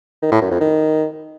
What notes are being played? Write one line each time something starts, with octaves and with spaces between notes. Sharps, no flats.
D#3
A2
F#2
F2
D#3